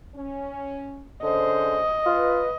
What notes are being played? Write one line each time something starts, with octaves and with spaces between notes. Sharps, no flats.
C#4
D3 C#4 G#4 C5 D#5
F4 B4